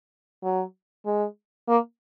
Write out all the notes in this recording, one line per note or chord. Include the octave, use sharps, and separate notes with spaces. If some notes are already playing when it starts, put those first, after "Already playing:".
F#3
G#3
A#3